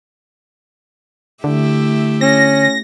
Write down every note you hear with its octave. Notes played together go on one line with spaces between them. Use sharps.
D3 A3 E4 G4
C#4 A#6